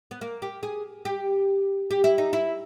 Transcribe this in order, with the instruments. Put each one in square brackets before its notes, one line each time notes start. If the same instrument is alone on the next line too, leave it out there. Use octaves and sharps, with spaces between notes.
[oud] B3
A#3
G4
G#4
G4
G4
E4
D#4
E4